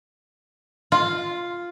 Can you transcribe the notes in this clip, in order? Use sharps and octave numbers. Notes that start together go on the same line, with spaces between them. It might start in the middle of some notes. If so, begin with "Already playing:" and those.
F4